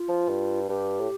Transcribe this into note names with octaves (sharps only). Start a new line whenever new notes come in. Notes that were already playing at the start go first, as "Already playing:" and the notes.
Already playing: F4
F3
G2
G2 G4
A2